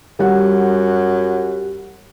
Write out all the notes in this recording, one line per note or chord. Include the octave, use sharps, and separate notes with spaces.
F#2 G3 F#5